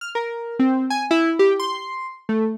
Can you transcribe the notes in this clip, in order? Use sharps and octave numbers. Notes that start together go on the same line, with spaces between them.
F6
A#4
C4
G#5
E4
G4
C6
A3